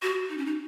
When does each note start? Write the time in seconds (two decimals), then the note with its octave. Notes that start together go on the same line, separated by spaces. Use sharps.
0.02 F#4
0.29 D#4
0.38 C#4
0.46 D#4